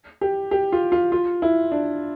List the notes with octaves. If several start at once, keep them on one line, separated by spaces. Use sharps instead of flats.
G4
G4
F4
F4
F4
E4
D4